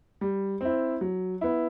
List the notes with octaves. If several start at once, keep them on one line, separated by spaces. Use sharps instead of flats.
G3
C4 E4
F#3
B3 E4